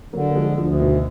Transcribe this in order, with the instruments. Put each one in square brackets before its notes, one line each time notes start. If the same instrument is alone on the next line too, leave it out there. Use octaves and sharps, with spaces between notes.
[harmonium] D3 [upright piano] F#3 A#3
[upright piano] A#3
F3 G#3
[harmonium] D2 [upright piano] D3 F3
[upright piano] B2 D#3